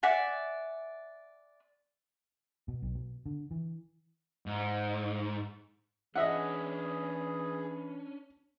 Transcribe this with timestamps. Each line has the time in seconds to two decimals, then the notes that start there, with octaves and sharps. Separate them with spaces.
0.03 D5 E5 F#5 G#5
2.68 B2
2.82 B1
2.95 B2
3.26 D3
3.51 E3
4.46 G#2
6.16 E3 C#4 D4 G#4 D#5 E5 F#5